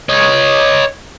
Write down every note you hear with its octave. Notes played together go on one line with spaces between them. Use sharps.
C#5 D#5